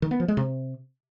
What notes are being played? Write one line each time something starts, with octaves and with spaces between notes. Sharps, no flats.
D#3
B3
F3
G#3
C3